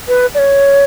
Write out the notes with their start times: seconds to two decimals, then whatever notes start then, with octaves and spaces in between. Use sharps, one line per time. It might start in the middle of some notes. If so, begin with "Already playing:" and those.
0.08 B4
0.35 D5
0.38 C#5